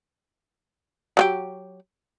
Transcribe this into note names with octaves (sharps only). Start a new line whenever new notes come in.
F#3 F4 G4